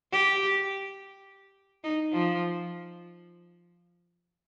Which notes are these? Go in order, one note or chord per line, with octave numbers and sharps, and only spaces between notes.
G4
D#4
F3